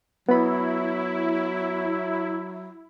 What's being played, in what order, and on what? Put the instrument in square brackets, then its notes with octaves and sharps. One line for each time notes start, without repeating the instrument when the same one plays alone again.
[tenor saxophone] F#3 [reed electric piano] B3 B5 [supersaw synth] E4